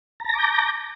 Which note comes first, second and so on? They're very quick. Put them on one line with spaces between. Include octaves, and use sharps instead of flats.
A#5 A5 A#6 D6 G6